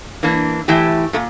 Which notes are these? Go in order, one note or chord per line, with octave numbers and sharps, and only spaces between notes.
E3 A#3 D4
E3 A3 E4 G4
A#2 A3